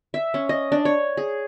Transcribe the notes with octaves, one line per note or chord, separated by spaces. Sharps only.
E5
C#4
D#5
D4
C#5
G#4